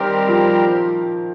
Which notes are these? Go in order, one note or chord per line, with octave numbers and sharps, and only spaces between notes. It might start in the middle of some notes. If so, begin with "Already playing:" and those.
Already playing: D#3 G3 C4 G4 A#4
F3